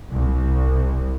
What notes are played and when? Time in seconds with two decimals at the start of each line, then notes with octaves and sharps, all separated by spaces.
0.10 C2